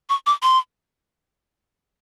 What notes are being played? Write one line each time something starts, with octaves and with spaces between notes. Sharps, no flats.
C#6
D6
C6